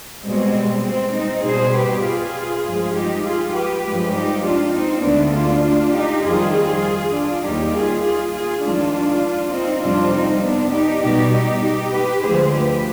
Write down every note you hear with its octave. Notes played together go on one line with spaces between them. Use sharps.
B2 G3 G#3 C4
G#3 C4
C4 D#4
B2 G3 G#4 C5
G4 B4
F4 G#4
G2 F3 G#3
D#4 G4
F4 G#4
G4 B4
G2 F3 G#3
D#4 G4
D4 F4
C4 D#4
D2 D3 G#3 B3 D4
D4 F4
D#4 G4
F2 D#3 G3 F4 G#4
F4 G#4
D4 F4
D#2 D#3 G3 D#4 G4
F4 G#4
F4 G#4
F4 G#4
F2 D#3 G#3 D4 F4
C4 D#4
F2 C3 G3 D4 F4
C4 D#4
B3 D4
D#4 G4
B2 G3 D#4 G4
D#4 G4
G4 B4
D2 D3 F3 G#3 G#4 C5
G4 B4